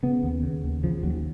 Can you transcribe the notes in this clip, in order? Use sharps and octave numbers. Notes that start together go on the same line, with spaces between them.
C#3 B3
D#2
C#3
D#2
C#3 F3
D#2 F#3